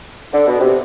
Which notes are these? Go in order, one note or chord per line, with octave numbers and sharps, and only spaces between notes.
D3
B2
C3